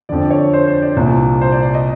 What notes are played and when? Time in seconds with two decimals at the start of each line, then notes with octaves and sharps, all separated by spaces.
0.09 F2 D3 D5
0.25 D5
0.30 C#5
0.54 C5
0.67 C5
0.82 D5
0.97 C2 A#2
1.41 C5
1.52 D5
1.63 D5
1.74 D#5